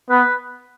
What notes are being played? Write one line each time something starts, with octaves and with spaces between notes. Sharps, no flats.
B3 B4